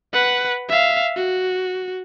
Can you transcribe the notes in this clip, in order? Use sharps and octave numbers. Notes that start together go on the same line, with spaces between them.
B4 F#5
E5 F5
F#4